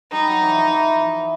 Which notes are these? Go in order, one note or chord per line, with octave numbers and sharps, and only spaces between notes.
G3 D#4
F#3
E3
F3
E3
E3